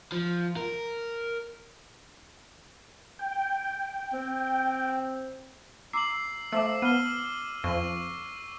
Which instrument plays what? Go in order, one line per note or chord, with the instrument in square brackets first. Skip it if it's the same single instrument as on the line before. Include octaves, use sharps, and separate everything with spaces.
[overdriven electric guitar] F3
A#4
[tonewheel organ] G5
[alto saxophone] C4
[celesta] A#5 D6 E6 [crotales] C7 F#7
[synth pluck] A3 [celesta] C5 F5 A5 [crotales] D6 E6
[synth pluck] B3 [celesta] F6 [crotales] D#7 G7
[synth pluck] F2 [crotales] C#6